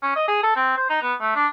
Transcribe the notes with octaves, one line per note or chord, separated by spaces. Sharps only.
C#4
D#5
G#4
A4
C4
C5
D#4
B3
A3
D4